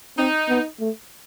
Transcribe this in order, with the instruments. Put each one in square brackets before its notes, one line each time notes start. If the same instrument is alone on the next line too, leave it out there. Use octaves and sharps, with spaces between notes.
[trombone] C4 [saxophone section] D#4
[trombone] B3
A3